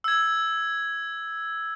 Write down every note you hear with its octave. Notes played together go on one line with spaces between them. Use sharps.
E6 G#6